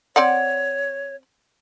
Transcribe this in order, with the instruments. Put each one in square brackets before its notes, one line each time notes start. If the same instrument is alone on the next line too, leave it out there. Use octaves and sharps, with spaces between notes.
[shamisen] C4 D5 F#5 [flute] C#5